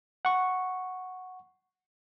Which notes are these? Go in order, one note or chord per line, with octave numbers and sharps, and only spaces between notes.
F#5 C#6